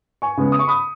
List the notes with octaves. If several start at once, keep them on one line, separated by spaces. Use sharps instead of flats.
G#5 C#6
C#3 G#3 B3
D#6
C#6
B5 D#6